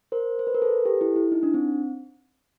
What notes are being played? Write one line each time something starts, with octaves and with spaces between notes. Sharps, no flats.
A#4 C5
C5
B4
A#4
A4 B4
G4 A4
E4
E4
D#4
D4
C4